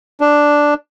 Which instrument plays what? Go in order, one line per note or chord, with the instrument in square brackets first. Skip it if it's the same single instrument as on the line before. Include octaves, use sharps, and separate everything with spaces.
[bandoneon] D4